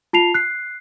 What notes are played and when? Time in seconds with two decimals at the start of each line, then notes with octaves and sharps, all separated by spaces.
0.13 F4 A5 C7 F7
0.34 F#6 C7